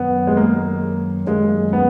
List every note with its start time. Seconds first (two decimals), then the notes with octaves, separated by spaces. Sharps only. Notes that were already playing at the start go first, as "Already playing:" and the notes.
Already playing: F#2 D#3 F#3 B3
0.27 G#3
0.37 A#3
1.27 F#2 D#3 F#3 G#3 A#3 C#4
1.73 B3